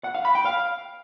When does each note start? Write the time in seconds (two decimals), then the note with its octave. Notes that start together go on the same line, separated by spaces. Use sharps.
0.04 F#5
0.15 F5
0.25 B5
0.35 G5
0.45 F5